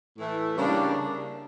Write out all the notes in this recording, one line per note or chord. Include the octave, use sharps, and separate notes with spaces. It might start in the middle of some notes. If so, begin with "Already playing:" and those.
A2 E3 A3
C#3 G3 A#3 D4